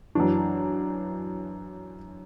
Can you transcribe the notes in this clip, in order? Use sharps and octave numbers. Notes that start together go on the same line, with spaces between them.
F#2 E3 D4